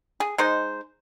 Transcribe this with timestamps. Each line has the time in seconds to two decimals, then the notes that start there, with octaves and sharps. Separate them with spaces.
0.20 G#4
0.38 G#3 D#4 C5